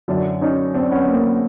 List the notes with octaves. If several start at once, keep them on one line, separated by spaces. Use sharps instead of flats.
F#2 D3 F#3 D4 E4
C#4 D#4
C4 D4
B3 C#4
A#3 C4
B3